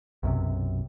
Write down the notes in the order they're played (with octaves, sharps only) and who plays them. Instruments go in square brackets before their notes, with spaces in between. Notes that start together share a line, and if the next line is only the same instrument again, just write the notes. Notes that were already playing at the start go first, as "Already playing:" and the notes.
[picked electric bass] B1 F#2 C3